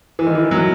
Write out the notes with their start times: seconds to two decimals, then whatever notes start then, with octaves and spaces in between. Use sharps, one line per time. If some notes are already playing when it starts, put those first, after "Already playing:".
0.19 E3
0.27 D#3
0.35 E3
0.51 F#3